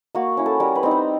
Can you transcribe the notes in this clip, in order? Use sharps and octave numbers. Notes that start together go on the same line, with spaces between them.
A#3 F#4
C#4 E4
A4
G3 A#4
B4
C4 D#4
C5